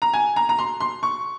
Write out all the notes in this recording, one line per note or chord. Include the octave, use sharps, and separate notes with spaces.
A#5
G#5
A#5
A#5
C6
C6
C#6